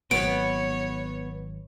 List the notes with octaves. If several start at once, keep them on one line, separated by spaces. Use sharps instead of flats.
G#1 F#3 B3 C#5 D7